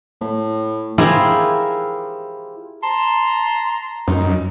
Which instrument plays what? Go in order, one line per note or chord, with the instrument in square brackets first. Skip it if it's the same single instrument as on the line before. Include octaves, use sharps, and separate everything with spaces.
[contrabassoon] A2
[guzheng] E4 F4 G4 G#4 A#4 C5
[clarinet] A5 [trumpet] A#5 [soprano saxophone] C6
[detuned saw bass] F#2 [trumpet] D#4